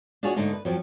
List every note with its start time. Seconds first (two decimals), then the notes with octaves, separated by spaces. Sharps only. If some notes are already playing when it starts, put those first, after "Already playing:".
0.23 D4 F4 F#4 G#4 C#5
0.36 G#2 D3 A3 D4 D#4
0.53 B4
0.65 F2 F3 F#3